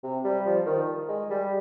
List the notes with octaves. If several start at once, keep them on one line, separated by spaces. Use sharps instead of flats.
C3
G3
F3
D#3
G#3
G3